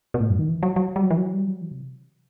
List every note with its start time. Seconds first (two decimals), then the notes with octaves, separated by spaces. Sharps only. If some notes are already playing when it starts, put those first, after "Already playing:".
0.14 B2
0.20 A2
0.30 F#2
0.39 D#3
0.49 E3
0.63 F#3
0.76 F#3
0.96 G3
1.03 F#3
1.11 E3
1.17 F#3
1.34 G3
1.48 F#3
1.62 E3
1.71 C3